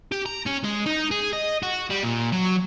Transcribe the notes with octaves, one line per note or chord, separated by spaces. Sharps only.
G4
A#5
C#4
G#3
D#4
G#4
D#5
F#4
G3
A#2
F#3